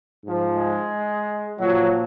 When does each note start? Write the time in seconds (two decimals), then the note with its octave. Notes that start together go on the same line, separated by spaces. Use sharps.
0.24 G#2 F3
0.56 G#3
1.59 A#2 F3 F#3